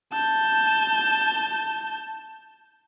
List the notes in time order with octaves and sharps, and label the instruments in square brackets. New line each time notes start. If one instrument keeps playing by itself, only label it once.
[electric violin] A5 G6